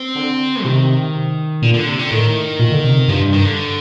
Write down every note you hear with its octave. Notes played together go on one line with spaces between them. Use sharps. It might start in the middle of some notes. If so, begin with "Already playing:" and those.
Already playing: C4
D3
C3 D#3
A#2 D3
D3
C3
D3
A2 D#3
A#2
D3
C3
C3
G2 F3
D#3
D3